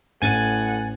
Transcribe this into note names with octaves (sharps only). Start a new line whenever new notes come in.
A1 A2 F#5 G#5 G#6 A6 D#7